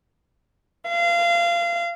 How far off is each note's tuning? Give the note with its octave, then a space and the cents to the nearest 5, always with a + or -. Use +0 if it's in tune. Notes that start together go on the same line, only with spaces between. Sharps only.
F5 -25